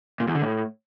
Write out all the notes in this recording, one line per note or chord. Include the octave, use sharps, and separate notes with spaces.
A#2
E2
D3
A2